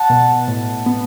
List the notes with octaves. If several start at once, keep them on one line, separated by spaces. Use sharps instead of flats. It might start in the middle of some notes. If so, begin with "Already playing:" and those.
Already playing: F#5 A5
B2
A2
B3